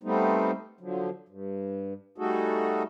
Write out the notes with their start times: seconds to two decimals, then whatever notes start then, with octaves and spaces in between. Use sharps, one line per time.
0.03 G3 A3 B3 C4 D#4
0.81 D3 F3 F#3
1.29 G2
2.18 G3 A3 D#4 F#4 G#4 A4